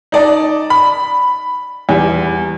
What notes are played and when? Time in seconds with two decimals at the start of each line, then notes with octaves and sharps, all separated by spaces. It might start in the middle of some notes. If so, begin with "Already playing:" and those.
0.12 D#4 D5 A5
0.70 B5
1.89 E2 G3